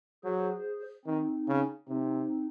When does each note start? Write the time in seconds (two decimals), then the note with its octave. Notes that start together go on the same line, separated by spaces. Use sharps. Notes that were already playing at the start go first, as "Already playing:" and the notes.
0.24 F#3 G#4 C5
1.06 D#3 C4 D#4
1.48 C#3
1.88 C3 C4 D#4